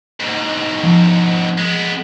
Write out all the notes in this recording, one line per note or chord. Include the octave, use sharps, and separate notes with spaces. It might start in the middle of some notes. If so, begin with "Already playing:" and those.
G#2 B2
F3
G#3 B3